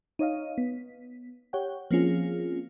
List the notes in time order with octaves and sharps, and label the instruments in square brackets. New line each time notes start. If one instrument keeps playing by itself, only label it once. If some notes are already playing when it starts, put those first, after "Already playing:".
[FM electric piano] D#4 C#5 D#5 F5
B3
G4 C#5 F#5 G5
F3 A#3 C4 C#4 F4 G#4